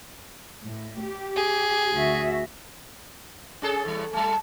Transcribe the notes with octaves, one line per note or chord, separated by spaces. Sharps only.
A2
G4
G#4
D2 F#4 E5
C#4 G#4 A4
E2 A2 G3
G3 A3 A5